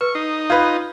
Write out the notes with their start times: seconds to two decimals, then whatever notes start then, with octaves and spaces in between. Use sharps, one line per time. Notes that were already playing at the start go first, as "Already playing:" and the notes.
0.01 B4 C#6 F6
0.15 D#4 C7
0.50 F4 B4 G6 G#6 D#7